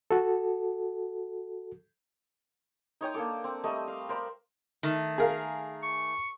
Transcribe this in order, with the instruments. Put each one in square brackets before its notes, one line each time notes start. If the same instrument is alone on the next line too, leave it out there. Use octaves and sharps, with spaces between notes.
[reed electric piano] F#4 A4
[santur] D#4 C#5 G5 D#6
A#3 D4 A4 D6
C4
G3 A3 D#5
F5
A#4 C5 D5 B5
[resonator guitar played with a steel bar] D#3 A3
[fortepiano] G#4 A#4 F5
[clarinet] C#6